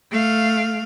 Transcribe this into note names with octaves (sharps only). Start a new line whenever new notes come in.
A3 F5